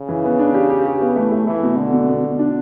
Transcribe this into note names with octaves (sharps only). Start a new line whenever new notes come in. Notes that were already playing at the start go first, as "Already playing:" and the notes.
Already playing: C#3
E3
B3
D4
G4
G4
G4
B3
E3 A3
A3
E3 A3
B2
B2 D3
B2
B2
B2
D4